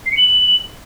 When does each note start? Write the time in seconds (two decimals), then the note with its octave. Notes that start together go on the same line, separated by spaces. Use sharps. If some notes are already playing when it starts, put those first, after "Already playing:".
0.06 C7
0.12 C#7
0.17 F#7